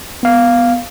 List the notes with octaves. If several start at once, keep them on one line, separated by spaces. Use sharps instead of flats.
B3 F5